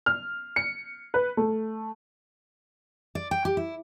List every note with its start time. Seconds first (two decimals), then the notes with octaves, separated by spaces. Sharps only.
0.06 F6
0.56 C#7
1.14 B4
1.37 A3
3.15 D5
3.31 G5
3.45 G4
3.57 E4